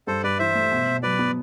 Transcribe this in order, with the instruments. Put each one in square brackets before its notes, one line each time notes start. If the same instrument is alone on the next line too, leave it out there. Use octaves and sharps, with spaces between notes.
[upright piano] G2 [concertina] A4 C5
[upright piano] G2 [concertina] B4 D5
[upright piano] E3 [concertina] C5 E5
[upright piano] A3
B2
B2
[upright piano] F#3 [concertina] B4 D5
[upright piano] B3